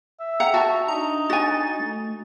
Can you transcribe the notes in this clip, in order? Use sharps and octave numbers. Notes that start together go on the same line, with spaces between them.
E5
F#5 G5 A#5
F#4 A5
D4 D#4 A#5
F#4 G#5 A6
A3